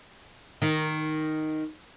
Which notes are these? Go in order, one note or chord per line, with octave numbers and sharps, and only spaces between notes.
D#3